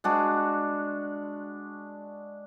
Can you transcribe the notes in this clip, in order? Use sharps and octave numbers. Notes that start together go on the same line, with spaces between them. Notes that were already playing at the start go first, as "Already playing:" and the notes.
G#3 D4 F#4